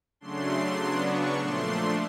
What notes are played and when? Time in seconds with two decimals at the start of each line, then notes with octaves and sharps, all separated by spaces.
0.20 C#3 F#3 A3 D4 C6
0.80 C#3 F#3 B3 D4
1.09 C#6
1.38 A#2 F3 A3 D4 C6